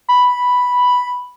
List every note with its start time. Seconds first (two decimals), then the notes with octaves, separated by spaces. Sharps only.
0.09 B5